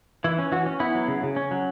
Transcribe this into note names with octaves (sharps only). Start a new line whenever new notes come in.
E3 E4
C#4
E3 F#4
C#4
B3 E4
F#3
C#3
C#3
C#4
F#3